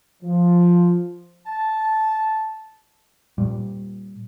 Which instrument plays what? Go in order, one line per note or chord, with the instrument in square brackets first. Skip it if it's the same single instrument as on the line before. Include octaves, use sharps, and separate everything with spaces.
[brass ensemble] F3
[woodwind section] A5
[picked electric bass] A#2 G3